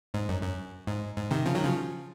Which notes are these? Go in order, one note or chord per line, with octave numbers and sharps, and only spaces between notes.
G#2
F#2
F#2
G#2
G#2
C3 D#3
C#3 F3
D#3 F#3
C#3 F3